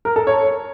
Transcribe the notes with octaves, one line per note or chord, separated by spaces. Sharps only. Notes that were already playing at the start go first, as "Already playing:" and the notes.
A#4
A4
C#5